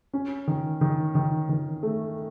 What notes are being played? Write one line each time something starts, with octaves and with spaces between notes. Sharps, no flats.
C#4
D#3
D#3
D#3
D#3
A3